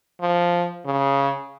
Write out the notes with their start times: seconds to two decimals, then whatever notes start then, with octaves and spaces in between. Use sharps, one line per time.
0.21 F3
0.86 C#3